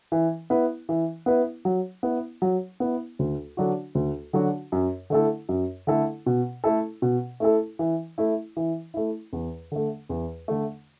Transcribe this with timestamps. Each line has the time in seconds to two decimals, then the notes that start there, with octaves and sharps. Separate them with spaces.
0.12 E3
0.50 B3 E4 B4
0.89 E3
1.26 B3 E4 B4
1.65 F#3
2.03 B3 E4
2.42 F#3
2.80 B3 E4
3.19 D2
3.57 D3 F#3 D4 F#4
3.95 D2
4.33 D3 F#3 D4 F#4
4.72 F#2
5.10 D3 A3 E4 A4
5.49 F#2
5.87 D3 A3 E4 A4
6.26 B2
6.64 A3 E4 A4
7.02 B2
7.40 A3 E4 A4
7.79 E3
8.18 A3 E4
8.57 E3
8.94 A3 E4
9.33 E2
9.72 D3 A3
10.09 E2
10.48 D3 A3